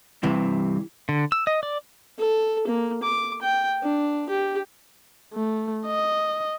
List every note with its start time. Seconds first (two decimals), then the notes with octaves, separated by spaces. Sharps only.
0.23 G2 C3 E3
1.09 D3
1.32 E6
1.47 D#5
1.63 D5
2.18 A4
2.67 A#3
3.03 D6
3.41 G5
3.83 D4
4.29 G4
5.34 A3
5.87 D#5